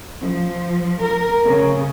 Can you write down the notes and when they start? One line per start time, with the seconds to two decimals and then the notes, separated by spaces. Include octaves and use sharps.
0.21 F3
1.03 A#4
1.46 C#3